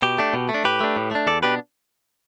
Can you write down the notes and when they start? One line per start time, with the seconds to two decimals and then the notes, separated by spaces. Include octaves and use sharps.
0.02 B2 G4
0.18 A3 D4
0.34 B2
0.49 A3
0.54 D4
0.64 A2 G4 B4
0.81 A3 D4
0.97 A2
1.11 A3 D4
1.27 E2 A4 D5
1.43 B2 B3 D4 G4 B4